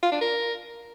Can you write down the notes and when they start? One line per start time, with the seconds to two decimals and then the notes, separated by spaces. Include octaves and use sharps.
0.03 F4
0.12 D4
0.21 A#4